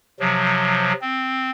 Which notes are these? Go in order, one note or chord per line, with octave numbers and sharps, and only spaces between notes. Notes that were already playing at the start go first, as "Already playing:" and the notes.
C3 F3 F#3
C4